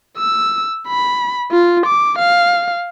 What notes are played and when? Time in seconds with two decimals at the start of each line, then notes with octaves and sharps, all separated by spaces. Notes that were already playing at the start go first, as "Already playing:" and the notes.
0.18 E6
0.88 B5
1.52 F4
1.86 D6
2.19 F5